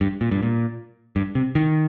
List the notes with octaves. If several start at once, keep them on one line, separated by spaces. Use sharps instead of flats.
G2
A#2
G2
A#2
G2
C3
D#3